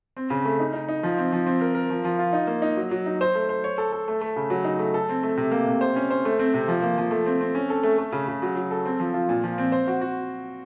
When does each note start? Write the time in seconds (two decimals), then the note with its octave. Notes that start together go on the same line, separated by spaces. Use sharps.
0.17 C4
0.30 C#3
0.45 A3
0.59 D#4
0.73 D#4
0.88 D#4
1.03 F3
1.18 C4
1.33 F3
1.47 C4
1.61 A#4
1.75 A#4
1.90 F3
2.05 F3
2.19 F4
2.33 D#4
2.47 A#3
2.62 D#4
2.77 F#3
2.91 F#3
3.06 D#4
3.21 C5
3.35 A3
3.49 C5
3.64 C#5
3.78 A4
3.92 A4
4.08 A3
4.21 A3
4.36 C#3
4.50 F#3
4.65 D#4
4.79 A3
4.94 A4
5.09 C4
5.23 A3
5.37 C3
5.52 A#3
5.67 C3
5.81 C5
5.96 C#4
6.11 C5
6.25 A3
6.39 C4
6.54 C3
6.68 F3
6.82 A#3
6.98 F3
7.11 A3
7.26 C4
7.41 C4
7.55 C#4
7.70 A4
7.83 A3
7.98 A3
8.12 C#3
8.28 C#3
8.42 F#3
8.56 F#3
8.71 A4
8.86 C4
9.00 F3
9.14 F4
9.29 A#2
9.43 F3
9.58 C4
9.72 C5
9.87 F#4
10.01 F#4